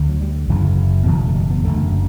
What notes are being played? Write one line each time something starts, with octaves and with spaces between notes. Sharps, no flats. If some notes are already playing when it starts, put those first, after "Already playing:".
Already playing: D2 D3
F#3
G3
F#1 F#2 C#3 E3
F#1 E2 B2 E3
A3
G3
B3
F#1 F#2 D3 A3